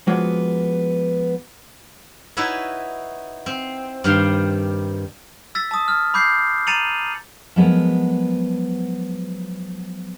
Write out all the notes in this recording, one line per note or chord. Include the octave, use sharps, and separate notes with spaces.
F3 G#3 A#3 B3 F#4
D#4 E4 F#4 B4 C#5 E5
C4
G2 D#3 G3 F5 G5 C6
E6 A6 B6
A5 D#6
F6
B5 D6 G6 C7
A#5 A6 C#7 D#7 F7 F#7
F3 F#3 G#3 B3 A4 A#4